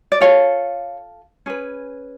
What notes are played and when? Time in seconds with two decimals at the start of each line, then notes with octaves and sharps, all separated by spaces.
0.12 D5
0.21 F4 A4 C#5 F5
1.46 C#4 G#4 B4